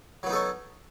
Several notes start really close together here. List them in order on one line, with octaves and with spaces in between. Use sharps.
F#3 B3 D#4 A4 C#4